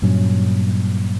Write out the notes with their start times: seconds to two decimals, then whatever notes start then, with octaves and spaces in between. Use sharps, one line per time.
0.02 G2 A#2 F#3 C#4